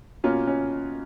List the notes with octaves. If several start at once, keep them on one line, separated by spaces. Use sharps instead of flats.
B2 A#3 C#4 F4
C#4